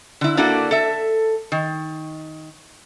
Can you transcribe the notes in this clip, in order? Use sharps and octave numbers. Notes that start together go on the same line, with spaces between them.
D3 E4
A#3 D4 E4 F#4 A4
A4 E5
D#3